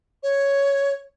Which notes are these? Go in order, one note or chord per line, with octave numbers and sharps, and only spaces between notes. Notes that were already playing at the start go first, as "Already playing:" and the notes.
C#5